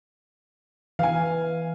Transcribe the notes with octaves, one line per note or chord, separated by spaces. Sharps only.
E3 F5 G#5